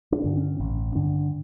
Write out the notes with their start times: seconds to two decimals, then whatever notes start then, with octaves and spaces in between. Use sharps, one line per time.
0.12 D4
0.24 G2 D3
0.37 C#4
0.60 A1 C#4
0.95 G2 D3 D4